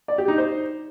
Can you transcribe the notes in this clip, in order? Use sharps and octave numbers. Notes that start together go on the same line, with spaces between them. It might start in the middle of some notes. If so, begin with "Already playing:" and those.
D5
G4
D#4
C5